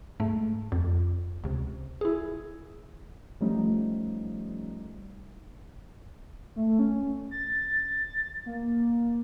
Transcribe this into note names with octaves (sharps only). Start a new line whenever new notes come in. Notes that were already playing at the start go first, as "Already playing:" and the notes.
G#2 A3
F2
C#2 C3
E4 G#4
F3 G3 A3 C#4 D#4
A3
C#4
A6
A#3